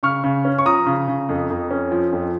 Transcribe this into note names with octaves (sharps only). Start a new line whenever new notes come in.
C#3 C#6 F6
C#3
C#4
C#6
F3 A#5 D#6
C#3
C#3
F2
F2
C#4
F3
F2